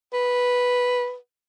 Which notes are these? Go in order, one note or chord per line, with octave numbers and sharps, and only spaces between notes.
B4